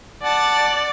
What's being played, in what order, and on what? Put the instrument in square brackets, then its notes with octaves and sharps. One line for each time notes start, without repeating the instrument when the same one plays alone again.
[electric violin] D5 [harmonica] F#5 A5